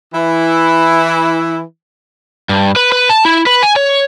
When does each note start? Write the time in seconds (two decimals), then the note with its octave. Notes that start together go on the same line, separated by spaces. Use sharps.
0.13 E3 E4
2.49 G2
2.76 B4
2.92 B4
3.09 A5
3.25 E4
3.47 B4
3.63 G#5
3.76 C#5